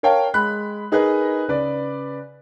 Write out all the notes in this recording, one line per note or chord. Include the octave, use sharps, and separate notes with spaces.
A#4 C#5 F5 G5 A5
G#3 B5 F#6
D#4 G#4 A#4 B4 D#5
C#3 B4 D5